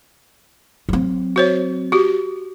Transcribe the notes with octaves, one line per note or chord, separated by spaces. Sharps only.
F#3 C4
F#4 C5 C#5
F#4 G4